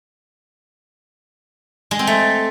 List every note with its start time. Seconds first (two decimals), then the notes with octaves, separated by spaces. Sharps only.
1.91 G#3
1.99 C4
2.07 A3